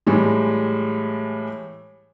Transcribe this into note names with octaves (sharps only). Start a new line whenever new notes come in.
A2 E3 G3 G#3